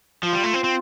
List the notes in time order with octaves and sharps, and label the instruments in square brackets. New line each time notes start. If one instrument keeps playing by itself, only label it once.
[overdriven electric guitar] F3 [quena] F4
[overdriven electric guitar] G3
A3
C4
C4